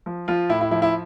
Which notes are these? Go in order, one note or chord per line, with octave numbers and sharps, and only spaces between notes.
F3
F3 F4
A2 E4
E4
F3 E4
E4